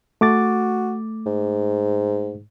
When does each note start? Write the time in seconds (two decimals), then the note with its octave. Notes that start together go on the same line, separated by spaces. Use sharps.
0.21 A3 F#4 D6 A6
1.25 G#2